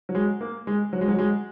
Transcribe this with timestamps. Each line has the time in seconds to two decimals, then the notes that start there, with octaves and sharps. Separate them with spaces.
0.09 F#3
0.15 G#3
0.41 A#3
0.67 G#3
0.93 F#3
1.01 G#3
1.08 F#3
1.19 G#3